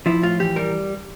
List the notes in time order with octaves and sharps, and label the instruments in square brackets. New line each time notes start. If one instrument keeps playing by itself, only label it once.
[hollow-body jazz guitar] F3 E4
A2 F4
E3 G4
G3 A#4